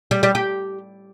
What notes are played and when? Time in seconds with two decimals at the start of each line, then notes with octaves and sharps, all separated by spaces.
0.11 G3
0.23 G3
0.35 G4